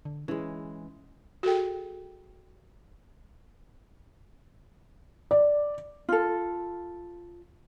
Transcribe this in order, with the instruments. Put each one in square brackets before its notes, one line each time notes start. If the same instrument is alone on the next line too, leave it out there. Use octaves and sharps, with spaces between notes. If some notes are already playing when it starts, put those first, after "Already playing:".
[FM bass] D3
[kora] E3 G#3 [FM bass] C#4
[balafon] F#4 G#4 A4 G5
[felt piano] D5
[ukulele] F4 A4